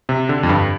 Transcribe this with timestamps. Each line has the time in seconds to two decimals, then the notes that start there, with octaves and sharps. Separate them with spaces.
0.09 C3
0.29 D3
0.43 F2
0.49 G2